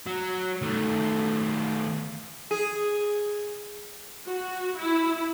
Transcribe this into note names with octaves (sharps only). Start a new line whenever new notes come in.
F#3
D#3 A3
G#4
F#4
E4